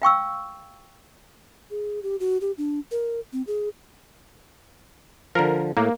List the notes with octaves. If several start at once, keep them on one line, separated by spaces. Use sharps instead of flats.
F5 G5 C#6 E6
G#4
G4
F#4
G4
D4
A#4
C4
G#4
D3 F3 A#4
A2 A#3